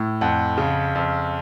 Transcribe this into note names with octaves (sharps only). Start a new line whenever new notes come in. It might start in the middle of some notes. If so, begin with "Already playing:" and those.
Already playing: A2
F2 F#5
C#3
F2